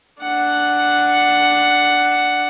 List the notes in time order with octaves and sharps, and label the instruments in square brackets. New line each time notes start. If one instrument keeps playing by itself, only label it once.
[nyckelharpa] D4 F#5